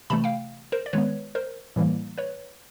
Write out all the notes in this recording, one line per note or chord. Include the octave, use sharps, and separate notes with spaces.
C3 E3 A3 A5 B5
F5 G5
A#4 C5
D5
D#3 G#3 B3 B4 C#5
A#4 C5
A2 E3 G3 A#3
B4 C#5